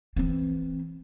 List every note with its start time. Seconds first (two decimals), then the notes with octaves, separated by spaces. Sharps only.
0.16 E3 C4